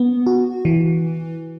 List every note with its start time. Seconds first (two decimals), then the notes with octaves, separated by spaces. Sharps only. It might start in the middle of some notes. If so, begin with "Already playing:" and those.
Already playing: B3
0.26 F#4
0.65 E3